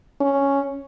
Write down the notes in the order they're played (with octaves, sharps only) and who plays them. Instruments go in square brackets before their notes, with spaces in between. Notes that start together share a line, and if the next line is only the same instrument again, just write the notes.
[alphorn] C#4